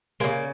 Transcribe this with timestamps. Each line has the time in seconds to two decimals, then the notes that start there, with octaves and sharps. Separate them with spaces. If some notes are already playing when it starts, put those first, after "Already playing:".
0.20 C#3 G#3 A#3